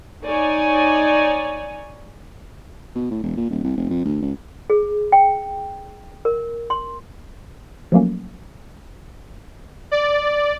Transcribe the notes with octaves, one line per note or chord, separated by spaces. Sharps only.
D#4 C#5 D5 G#5
B2
A2
E1
A#2
D#1
C2
F1
F2
D2
C#2
G#4
G5
A#4
C6
F3 F#3 A3 A#3 C#4
D5